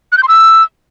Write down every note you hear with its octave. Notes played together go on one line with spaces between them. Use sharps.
F#6
G6
C6
E6